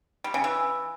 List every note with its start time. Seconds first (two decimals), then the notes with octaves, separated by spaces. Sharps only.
0.24 G3
0.34 C#3
0.44 E3